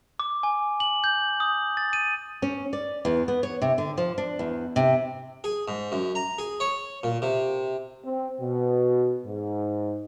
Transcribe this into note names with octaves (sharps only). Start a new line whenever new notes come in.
D6
G#5
F#7
G6
D#6
A6
D#7
C#4
D5
E2
B3
C#5
C3
D3
F3
D4
E2
C3
G#4
G#2
F#2
A#5
G#4
C#5
A#2
C3
C4
B2
G#2